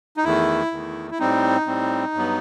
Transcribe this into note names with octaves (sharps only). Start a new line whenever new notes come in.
D#4
E2 D#3 A3 E4
E2 D#3 A3
E4
A2 G3 C4 D#4
A2 G3 C4
G2 F#3 B3